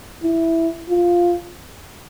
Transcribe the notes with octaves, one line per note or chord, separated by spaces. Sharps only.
E4
F4